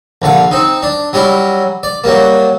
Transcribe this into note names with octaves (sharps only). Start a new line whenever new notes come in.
A#1 D3 F5
C4 D#4
D4
F#3 G3 C#4 E4
D5
F#3 G3 A#3